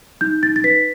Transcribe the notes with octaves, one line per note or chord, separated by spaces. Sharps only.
D#4 G6
D#4 A6
A6
B4 B6